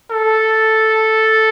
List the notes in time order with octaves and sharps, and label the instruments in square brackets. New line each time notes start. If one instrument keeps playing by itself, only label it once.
[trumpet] A4